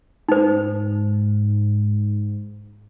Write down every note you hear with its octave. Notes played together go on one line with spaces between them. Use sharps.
G#2 D#4 C5